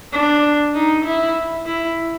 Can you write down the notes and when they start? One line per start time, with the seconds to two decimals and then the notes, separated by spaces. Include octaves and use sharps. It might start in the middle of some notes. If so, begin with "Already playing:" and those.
0.13 D4
0.75 D#4
1.06 E4
1.66 E4